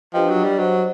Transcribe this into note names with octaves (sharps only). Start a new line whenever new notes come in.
F3 D4 G4 B4 D#5 G5
F#3
G3
F#3 C5 D#5 F#5